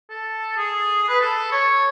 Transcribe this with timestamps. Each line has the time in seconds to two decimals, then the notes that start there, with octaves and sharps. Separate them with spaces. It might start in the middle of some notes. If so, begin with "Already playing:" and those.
0.10 A4
0.57 G#4
1.08 B4
1.20 A4
1.52 C#5